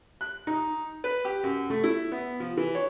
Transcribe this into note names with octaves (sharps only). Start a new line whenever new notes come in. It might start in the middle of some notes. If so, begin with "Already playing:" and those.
F#6
D#4
B4
G4
F#2
A3
E4
B3
F3
E3
C#5